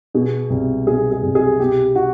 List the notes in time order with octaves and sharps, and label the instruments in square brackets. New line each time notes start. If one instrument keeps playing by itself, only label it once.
[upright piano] B2 G#4
C2
B2 G#4
G#4
C2
G#4
B2 G4
F#4